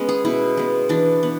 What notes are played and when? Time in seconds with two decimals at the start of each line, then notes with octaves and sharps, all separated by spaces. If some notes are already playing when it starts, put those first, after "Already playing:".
Already playing: G#3 B3 C#4
0.09 G#4
0.25 B2 E4
0.57 G#3 B3
0.89 E3 D4
1.23 B3